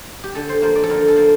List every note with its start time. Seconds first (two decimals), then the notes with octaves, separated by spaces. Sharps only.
0.24 G4
0.35 D3 A4
0.49 C5
0.62 F3 A#3 C5
0.76 D5
0.83 A4
0.90 D3 A#4
1.08 A4
1.16 F3 A#3